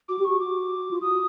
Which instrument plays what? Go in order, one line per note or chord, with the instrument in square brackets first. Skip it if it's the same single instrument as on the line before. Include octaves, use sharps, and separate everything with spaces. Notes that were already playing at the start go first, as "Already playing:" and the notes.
[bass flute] F#4 [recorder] D6
[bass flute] G4
[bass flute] F#4 [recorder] C#6
[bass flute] F#4 [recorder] D6
[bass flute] F4
[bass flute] F#4 [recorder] D#6